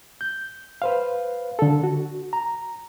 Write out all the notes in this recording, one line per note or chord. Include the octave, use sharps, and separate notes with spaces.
G6
B4 C5 F5
D3 A4
F#4
A#5